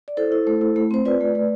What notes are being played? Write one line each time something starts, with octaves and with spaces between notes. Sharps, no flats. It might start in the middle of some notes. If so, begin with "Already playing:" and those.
D5
E4 A4 C5
E4
A3
E4
A3
C4 C5
F4 B4 D5
A3
A3